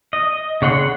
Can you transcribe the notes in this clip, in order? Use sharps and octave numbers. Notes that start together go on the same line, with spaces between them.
D#5
C#3 C#5 F#5 C6